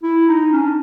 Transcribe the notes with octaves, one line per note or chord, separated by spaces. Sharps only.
E4
D#4
C#4
D4